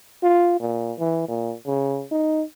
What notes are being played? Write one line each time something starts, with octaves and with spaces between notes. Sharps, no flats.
F4
A#2
E3
A#2
C#3
D#4